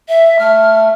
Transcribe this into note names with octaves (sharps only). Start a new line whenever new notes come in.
E5
A3 F6